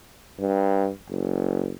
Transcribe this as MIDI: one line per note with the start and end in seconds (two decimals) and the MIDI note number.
0.40 0.90 43
1.10 1.73 30